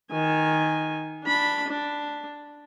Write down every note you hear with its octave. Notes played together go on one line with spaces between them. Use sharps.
D#3 G#5
D4 B5
D4